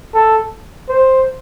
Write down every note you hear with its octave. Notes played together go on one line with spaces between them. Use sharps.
A4
C5